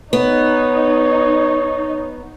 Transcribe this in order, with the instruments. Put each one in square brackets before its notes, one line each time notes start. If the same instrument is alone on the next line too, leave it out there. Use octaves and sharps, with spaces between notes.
[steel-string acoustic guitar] B3 [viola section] D#4 [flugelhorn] C#5